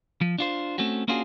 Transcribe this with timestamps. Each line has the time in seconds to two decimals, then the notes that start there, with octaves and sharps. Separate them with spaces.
0.21 F3
0.38 D4 F4 C5
0.78 A3 C4 C#4 F#4
1.08 A#3 C#4 D4 F4 F#4 G#4